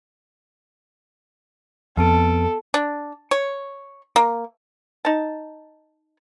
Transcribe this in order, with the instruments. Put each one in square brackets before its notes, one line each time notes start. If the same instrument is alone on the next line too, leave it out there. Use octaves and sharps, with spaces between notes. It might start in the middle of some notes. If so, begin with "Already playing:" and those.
[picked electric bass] F2 [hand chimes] B3 A5 D7 [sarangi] A4
[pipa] D4
C#5
A#3
D#4 A5